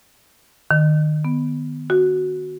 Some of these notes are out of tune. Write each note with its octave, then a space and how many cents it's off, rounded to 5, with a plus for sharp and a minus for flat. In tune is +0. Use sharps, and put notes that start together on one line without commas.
D#3 -30
B3 +0
F#4 +0